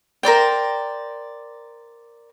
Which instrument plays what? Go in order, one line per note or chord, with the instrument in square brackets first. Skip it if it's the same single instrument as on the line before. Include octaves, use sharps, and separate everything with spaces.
[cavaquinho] A#4 C5 D5 G5